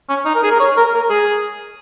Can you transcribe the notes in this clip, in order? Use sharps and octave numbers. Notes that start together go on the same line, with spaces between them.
C#4
D#4
A#4
G#4
A#4
C#5
A#4
A#4
G#4